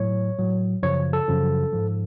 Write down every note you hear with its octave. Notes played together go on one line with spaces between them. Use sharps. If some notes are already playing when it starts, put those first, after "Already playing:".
Already playing: A2 F#3 C#5
A2 F#3
F#2 C#3 F3 C#5
A4
F#2 C#3 F3
G#2 F3